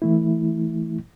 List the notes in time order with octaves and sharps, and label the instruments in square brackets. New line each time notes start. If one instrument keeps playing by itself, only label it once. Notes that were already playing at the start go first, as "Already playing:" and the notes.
[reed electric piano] E3 A3 E4